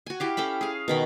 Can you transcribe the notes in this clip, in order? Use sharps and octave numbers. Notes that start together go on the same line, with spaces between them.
F#4 G#5
E4 G4 F5
C#4 A4 G5 B5
G#4 F5
B2 D#3 B5